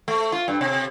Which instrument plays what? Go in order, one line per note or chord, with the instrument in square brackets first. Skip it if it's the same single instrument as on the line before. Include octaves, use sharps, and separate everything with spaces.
[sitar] A3
F4
G2
C3